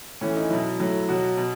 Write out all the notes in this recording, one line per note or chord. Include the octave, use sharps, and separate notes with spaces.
A2 E3 C#4
D#4
B2 F#3 E4
A2 F#3
B2 F#3 F#4
B2